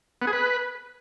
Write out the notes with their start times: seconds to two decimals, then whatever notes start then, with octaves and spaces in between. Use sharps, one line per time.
0.22 B3
0.27 G#4
0.33 B4